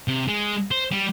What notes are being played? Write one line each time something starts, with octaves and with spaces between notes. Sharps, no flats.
C3
G#3
C5
G3